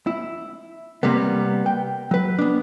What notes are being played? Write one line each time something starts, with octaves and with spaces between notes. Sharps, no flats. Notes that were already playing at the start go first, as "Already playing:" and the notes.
E4
C3 G3 A#3 B3
G5
F#3 B4
B3 D4